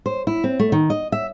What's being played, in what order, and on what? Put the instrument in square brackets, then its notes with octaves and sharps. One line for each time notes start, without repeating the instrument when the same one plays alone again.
[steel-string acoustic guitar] C5
E4
C4
A3
D#3
D#5
E5